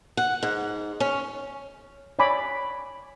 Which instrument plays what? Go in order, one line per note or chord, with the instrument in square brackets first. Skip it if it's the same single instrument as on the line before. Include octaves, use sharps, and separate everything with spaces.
[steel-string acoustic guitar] F#5
G#2
C#4
[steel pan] C#5 D5 G#5 B5 D6